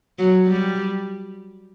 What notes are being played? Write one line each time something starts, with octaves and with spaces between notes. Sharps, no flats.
F#3
G3